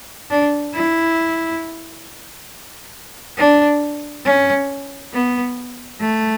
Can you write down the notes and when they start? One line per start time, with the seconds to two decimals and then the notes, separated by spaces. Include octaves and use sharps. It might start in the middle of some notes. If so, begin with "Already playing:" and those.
0.30 D4
0.74 E4
3.37 D4
4.25 C#4
5.13 B3
6.00 A3